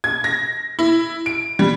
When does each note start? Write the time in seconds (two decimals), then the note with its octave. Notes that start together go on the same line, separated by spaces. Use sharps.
0.04 G#6
0.24 A#6
0.79 E4
1.26 D7
1.59 G3